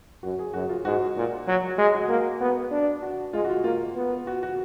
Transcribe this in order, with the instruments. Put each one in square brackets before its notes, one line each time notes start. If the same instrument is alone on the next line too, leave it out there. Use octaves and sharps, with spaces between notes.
[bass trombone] F#2 [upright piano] F#4
[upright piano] G#4
[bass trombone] F#2 [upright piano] F#4
[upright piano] F4
[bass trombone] G#2 [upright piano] F#4
[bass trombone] A#2
[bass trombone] F#3 [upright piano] F#4
[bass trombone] G#3
[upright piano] F#4
[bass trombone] A#3 [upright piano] F#4
[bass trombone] B3 [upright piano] F#4
[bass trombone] D4
[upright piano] F#4
[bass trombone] G#3 [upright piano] F4
[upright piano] F#4
F4
[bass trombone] A#3 [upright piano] F4
[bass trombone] B3
[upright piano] F#4
F#4